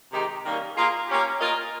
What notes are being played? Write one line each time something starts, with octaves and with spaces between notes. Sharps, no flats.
C3 D#3 G#3 D#4 G4
D#3 G3 A#3 C#4
A#3 F4 G#4
A#3 C#4 G4
A#3 F4 A#4 D#5